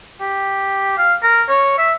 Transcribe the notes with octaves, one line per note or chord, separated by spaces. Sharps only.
G4
F5
A#4
C#5
E5